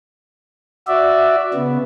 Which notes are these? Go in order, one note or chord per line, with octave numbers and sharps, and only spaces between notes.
F#4 D5 E5
C#3 B3